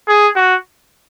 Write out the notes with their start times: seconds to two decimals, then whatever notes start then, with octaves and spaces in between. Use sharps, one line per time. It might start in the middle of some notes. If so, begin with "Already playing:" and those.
0.08 G#4
0.36 F#4